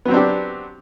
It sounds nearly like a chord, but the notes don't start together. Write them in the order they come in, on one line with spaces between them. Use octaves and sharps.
B3 F#3 C4 D4 G4